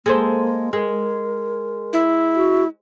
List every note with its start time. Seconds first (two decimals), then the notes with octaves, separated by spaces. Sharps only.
0.06 G#3 A#3 A4 C5
0.73 G#3 A#4
1.93 E4
2.36 F#4